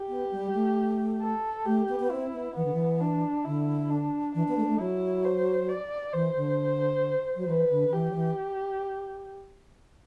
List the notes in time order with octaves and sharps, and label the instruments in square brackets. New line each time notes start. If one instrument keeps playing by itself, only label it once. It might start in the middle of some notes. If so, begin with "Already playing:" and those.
Already playing: [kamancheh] G4
[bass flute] B3
G3
A3
[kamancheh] A4
[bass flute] A3 [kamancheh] G4
[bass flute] B3
B3
[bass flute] C4 [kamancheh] E4
[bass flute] B3
[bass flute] E3 [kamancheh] B3
[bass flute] D3
E3
[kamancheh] D4
[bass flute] D3 [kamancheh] E4
[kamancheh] D4
[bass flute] E3 [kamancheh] D4
[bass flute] B3
A3
B3
A3
[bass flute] F#3 [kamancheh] E4
[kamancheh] C5
D5
[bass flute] E3 [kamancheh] C5
[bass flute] D3
F#3
[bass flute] E3 [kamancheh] B4
[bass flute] D3
D3
[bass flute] E3 [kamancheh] G4
[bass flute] F#3
E3